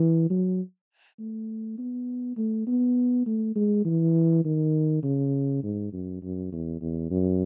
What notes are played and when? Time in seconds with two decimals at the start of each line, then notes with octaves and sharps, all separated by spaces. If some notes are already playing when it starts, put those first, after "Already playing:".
Already playing: E3
0.30 F#3
1.19 A3
1.78 B3
2.37 A3
2.67 B3
3.26 A3
3.56 G#3
3.85 E3
4.45 D#3
5.03 C#3
5.63 G#2
5.93 F#2
6.22 F#2
6.52 E2
6.81 E2
7.10 F#2